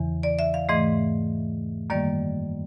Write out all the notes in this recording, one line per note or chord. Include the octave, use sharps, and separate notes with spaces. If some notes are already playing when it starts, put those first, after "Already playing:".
Already playing: E2 C#3 E3
D5
E5
F5
G#2 E3 A3 D#5
F#2 D#3 G3 A#3 D5